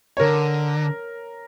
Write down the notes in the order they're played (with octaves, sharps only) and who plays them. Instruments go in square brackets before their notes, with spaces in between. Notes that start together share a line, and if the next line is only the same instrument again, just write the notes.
[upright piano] C#5
[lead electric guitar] D3 [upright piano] A#4